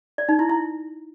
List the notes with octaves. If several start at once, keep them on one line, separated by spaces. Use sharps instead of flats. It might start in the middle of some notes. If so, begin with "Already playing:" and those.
D5
D#4
E4
E4